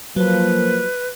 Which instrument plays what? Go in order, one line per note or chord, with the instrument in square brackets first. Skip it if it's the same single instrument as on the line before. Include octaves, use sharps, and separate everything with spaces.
[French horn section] F3 A#3 [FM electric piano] F#3 [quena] B4